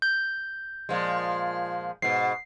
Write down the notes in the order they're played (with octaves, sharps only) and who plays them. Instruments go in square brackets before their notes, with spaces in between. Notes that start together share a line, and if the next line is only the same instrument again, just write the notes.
[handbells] G6
[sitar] A#2 F3 G#3
[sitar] G#2 B2 [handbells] C7